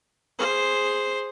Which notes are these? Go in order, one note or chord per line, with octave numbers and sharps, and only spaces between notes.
G#4 C5